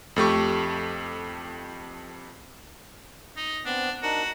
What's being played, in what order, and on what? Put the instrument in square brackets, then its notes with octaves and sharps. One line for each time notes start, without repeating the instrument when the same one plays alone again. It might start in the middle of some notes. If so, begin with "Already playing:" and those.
[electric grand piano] F2 A3 G4 C#6
[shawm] D#4
[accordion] B3 C4 [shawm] D4
[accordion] D4 D#4 A#4 [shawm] F#4